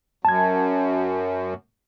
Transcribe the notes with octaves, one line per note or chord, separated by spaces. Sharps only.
F#2 A5 G#6